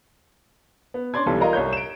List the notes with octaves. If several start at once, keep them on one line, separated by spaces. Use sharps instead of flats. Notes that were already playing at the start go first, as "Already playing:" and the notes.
B3
C#4 D4 D5 C6 G#6
B1 E3 G3 B3 A4
F4 A#4 D5 D#5 F5 A#5
C2 C#5 G6
D7 E7